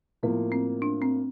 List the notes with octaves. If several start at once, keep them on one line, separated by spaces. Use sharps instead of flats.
A2 F3 A#3 B3
C4
D4
C4